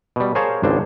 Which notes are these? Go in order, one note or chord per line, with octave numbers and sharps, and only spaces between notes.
B2 G3
G#4 A#4 C5 C#5 F5 A5
G#1 C#2 D4 C5